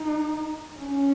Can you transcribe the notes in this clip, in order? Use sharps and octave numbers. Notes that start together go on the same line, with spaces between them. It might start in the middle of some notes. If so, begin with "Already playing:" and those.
Already playing: D#4
C#4